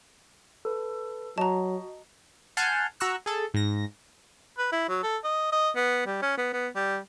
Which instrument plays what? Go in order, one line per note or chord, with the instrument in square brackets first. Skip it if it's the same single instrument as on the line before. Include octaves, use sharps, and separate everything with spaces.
[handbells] A4 B4
[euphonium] F#3 [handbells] F#4 D#5 [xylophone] A5 A#5
[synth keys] F#5 G#5 A5 C6 F6 G6
F#4 A#5 C#6 E6 F#6
G#4 A4
G#2 A#6
[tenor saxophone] B4
E4
F#3
A4
D#5
D#5
B3
G3
C#4
B3
B3
G3